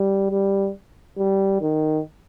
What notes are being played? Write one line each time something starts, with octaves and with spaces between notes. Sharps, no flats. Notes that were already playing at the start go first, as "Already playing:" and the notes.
Already playing: G3
G3
G3
D#3